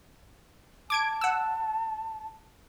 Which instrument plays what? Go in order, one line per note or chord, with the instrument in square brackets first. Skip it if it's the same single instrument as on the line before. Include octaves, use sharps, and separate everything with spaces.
[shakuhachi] A5 [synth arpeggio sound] D6 G#6 D7
[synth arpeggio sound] F#5 E6